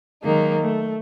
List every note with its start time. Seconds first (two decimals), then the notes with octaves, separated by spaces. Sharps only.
0.23 D#3 F#3 G#3 A#3 D#4
0.61 A3